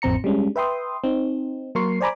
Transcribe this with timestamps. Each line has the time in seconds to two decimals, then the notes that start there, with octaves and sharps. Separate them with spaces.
0.02 A1 F2 C4 A#5 C#7
0.24 G3 G#3 C#4 D4
0.56 B4 E5 G5 C6 D#6
1.04 C4 D#4
1.75 F#3 A#3 A#4 C6 C#6 C7
2.01 C5 D5 G#5 A#5 B5 D6